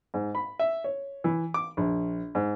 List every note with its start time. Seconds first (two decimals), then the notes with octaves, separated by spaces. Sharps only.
0.14 G#2
0.35 B5
0.59 E5
0.84 C#5
1.24 E3
1.54 D6
1.77 A#1
2.35 G#2